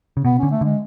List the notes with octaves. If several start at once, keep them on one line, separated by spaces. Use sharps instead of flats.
C#3
B2 B3
D3 C#4
A3
D3 G#3